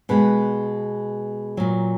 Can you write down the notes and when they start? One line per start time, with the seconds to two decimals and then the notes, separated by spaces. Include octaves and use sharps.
0.09 B2 G#3 B4
1.57 A#2 F#3